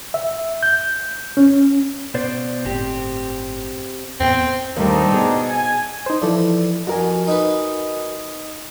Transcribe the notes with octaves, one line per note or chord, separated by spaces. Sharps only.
E5
G6
C#4
B2 C5 D5
G1 A2 C4 G4
E2 A2 B3 C4
D#2 G3 A3 C4 D4 D#4
B2 G#4
G#5
D#4 C5
E3 F3 A4 D5
F2 F#4 A#4 G#5
D#4 B4